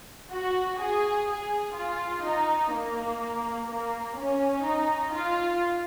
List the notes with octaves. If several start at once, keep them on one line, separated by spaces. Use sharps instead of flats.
F#4
G#4
G#4
F4
D#4
A#3
A#3
C#4
D#4
F4